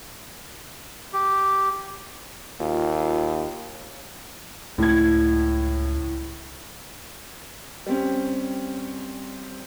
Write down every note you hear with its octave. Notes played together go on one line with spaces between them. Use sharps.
G4
D#2 F4
C#2 A2 G#6
G3 C4 C#4